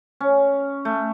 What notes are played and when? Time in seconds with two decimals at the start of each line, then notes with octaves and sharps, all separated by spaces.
0.20 C#4
0.85 A3